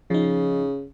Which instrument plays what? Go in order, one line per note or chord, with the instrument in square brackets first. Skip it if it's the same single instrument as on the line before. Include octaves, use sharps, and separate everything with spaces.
[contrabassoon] C#3 [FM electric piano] F3 D#4